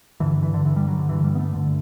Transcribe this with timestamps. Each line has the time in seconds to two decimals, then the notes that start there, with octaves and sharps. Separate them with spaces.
0.20 G2 D3 E3
0.43 E3
0.54 D3
0.65 G2 D3 E3
0.76 G3
0.88 F#3
0.99 D3
1.09 G2 D3 E3
1.24 G3
1.35 B3
1.39 A3
1.54 G2 D3